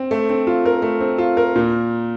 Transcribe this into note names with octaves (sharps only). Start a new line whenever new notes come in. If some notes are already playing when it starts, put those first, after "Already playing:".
Already playing: C4
A3
C4
F4
A#4
A3
C4
F4
A#4
A#2